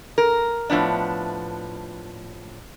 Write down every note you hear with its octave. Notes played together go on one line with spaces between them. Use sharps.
A#4
A2 F3 B3 D4